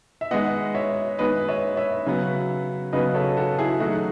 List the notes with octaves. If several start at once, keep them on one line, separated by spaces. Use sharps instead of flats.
E5
D#3 G#3 B3 D#5 F#5
C#5 E5
D#3 G#3 B3 B4 D#5
C#5 E5
C#5 E5
C#3 F#3 B3
C#3 F#3 B3 B4 D#5
A4 C#5
F#4 A4
E4 G#4
D#3 F#3 A3 D#4 F#4